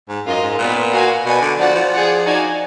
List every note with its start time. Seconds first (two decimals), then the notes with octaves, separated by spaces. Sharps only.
0.09 G#2
0.26 F#2 F4 A#4 D#5
0.42 G#2
0.58 A#2 B3 F4 B4 D5
0.92 F#4 A#4 F5 G#5
1.25 B2 F#4 D5 G#5
1.42 D3
1.59 F3 F#4 D5 F#5
1.75 F3
1.92 G#4 D5 F#5
2.25 D#4 F#4 D5 F5 G#5